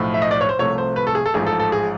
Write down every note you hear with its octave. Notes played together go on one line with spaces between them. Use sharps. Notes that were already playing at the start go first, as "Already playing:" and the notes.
Already playing: B1 A2 F3 A3
E5
D#5
D5
C#5
C5
C2 C3 F3 A3 C#5
C5
B4
A4
G#4
A4
A1 G#2 F3 G#4
A4
A4
G#4